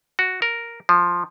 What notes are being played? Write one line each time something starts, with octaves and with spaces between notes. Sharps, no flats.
F#4
A#4
F3